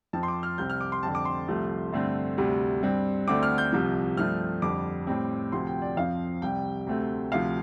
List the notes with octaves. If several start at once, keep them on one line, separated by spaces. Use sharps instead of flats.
F2 F3 C4 A5
C6
D6
F6
C2 C3 G3 C4 G6
F6
D6
C6
F2 D3 G3 C4 A5
D6
C6
C2 C3 F3 A3
G2 D3 A3 C4
D2 C3 G3
G2 G3 C4
D2 D3 A3 C4 D6
F6
G6
C2 C3 F3
G2 F3 A3 C4 F6
F2 D3 G3 D6
A2 G3 C4
D2 C3 F3 C4 C6
G5
D5
F2 F3 C4 F5
C2 C3 G3 G5
D2 C3 A3 C4
D2 C3 F3 F5